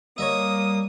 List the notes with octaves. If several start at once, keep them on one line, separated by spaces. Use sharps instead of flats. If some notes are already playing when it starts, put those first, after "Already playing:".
G3 A#3 C#5 D#5 E5 D#6